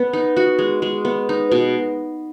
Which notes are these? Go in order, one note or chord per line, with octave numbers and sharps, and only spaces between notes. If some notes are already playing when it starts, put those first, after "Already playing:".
Already playing: B3
D#4
F#4
G#3
G#3
B3
D#4
B2